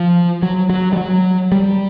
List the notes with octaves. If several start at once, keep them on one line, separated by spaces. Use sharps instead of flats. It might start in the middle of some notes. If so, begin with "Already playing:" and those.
Already playing: F3
F#3
F#3
G3
F#3
G3